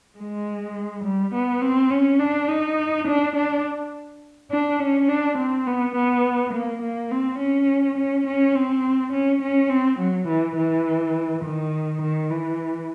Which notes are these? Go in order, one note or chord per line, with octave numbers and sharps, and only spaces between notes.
G#3
G3
B3
C4
C#4
D4
D#4
D4
D4
D4
C#4
D4
C4
B3
B3
A#3
A#3
C4
C#4
C#4
C#4
C4
C#4
C#4
C4
F#3
E3
E3
D#3
D#3
E3